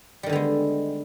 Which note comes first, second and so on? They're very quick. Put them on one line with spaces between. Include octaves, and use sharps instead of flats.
G3 D#3 D3 B3 G#3